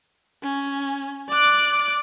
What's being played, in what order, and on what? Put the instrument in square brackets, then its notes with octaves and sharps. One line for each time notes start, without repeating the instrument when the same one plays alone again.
[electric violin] C#4
[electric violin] D5 F#6 [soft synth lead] D6